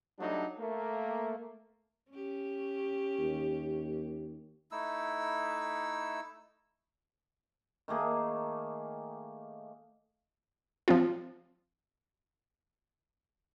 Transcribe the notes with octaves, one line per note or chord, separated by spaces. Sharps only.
F#3 G3 A3 D4 D#4
A3 A#3
C#4 G4
D#2
A3 D#4 E4 E6
D#3 A3 A#3 G#4
F3 C4 F4